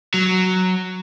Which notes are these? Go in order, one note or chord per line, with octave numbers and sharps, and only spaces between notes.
F#3